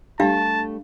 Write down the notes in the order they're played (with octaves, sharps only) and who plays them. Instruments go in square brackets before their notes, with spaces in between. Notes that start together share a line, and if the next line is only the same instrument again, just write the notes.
[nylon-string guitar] G3 A3 [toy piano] D4 G4 F5 [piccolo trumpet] A5